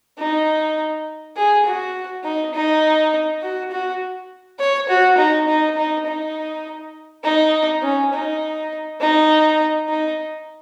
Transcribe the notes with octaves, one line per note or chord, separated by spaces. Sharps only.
D#4
G#4
F#4
D#4
D#4
F#4
F#4
C#5
F#4
D#4
D#4
D#4
D#4
D#4
C#4
D#4
D#4
D#4